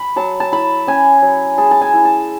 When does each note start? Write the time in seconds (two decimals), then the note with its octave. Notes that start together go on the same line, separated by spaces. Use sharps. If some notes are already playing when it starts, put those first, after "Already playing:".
Already playing: B5
0.16 F#3 A5
0.40 A5
0.52 E4 B5
0.87 C#4 G#5
1.22 F#3
1.58 G#3 A5
1.71 A5
1.81 G#5
1.94 E4
2.05 A5